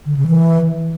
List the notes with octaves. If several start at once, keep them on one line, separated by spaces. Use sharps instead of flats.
D3
C#3
E3